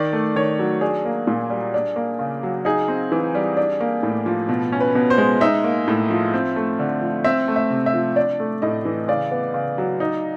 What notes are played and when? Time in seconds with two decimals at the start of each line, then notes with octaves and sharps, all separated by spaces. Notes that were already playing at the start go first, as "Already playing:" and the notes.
Already playing: D#3 D5
0.13 A3
0.36 D#3 C#5
0.59 F#3
0.81 D4 G#4
1.05 A#3
1.27 A#2
1.50 G3
1.74 D4
1.96 A#3
2.19 C#3
2.43 F#3
2.65 D#4 G#4
2.88 C4
3.12 E3
3.35 G3
3.57 D4
3.81 A#3
4.03 A2
4.26 F3
4.49 B2
4.72 C#4
4.80 B4
4.95 B2
5.10 C5
5.18 G#3
5.41 D#4 E5
5.64 A#3
5.88 A2
6.10 F3
6.34 C4
6.56 A3
6.79 D3
7.01 F3
7.24 C4 E5
7.48 A3
7.56 E5
7.70 C3
7.86 E5
7.94 F3
8.16 D4 D5
8.40 A3
8.62 A2 D#5
8.85 E3
9.08 C#3 D5
9.31 B3
9.54 C#3
9.78 F#3
10.00 D#4